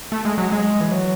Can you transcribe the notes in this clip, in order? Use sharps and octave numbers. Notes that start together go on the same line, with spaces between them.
A3
G#3
F#3
G#3
E3
F#3